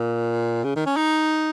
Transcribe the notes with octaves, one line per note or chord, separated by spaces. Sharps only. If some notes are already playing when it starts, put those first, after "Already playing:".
Already playing: A#2
C#3
D#3
C#4
D#4